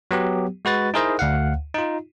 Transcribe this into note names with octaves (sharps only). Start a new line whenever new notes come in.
F#3 B3 G4
G#3 F#4 B4 A6
D#4 E4 G#4 A#4 C5 D#5
D2 F5 F#5
D#4 F4